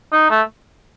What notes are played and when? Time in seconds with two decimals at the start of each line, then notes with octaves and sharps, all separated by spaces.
0.12 D#4
0.30 A3